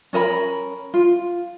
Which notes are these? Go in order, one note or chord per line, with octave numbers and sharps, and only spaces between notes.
C#4 A#4 D#5 B5
F4